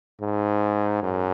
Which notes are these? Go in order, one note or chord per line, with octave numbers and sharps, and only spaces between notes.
G#2
F#2